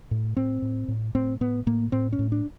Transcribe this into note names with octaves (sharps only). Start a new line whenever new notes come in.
A2
A2 C4
A2
A2
A2 C4
A2 B3
A2 A#3
A2 C4
C#4
A2
D4